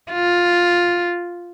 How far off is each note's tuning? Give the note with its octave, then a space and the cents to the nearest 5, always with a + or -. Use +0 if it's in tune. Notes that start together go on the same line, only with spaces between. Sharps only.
F4 +5